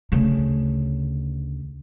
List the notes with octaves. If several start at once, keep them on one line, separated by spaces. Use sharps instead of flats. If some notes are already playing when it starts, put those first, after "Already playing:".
D2 C#3